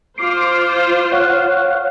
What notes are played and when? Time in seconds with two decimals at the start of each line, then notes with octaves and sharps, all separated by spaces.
0.18 F4 C5 C6 D6
1.12 C#5 F5 F#5